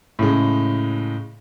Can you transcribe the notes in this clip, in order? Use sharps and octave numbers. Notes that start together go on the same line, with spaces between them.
A2 C#3 G#3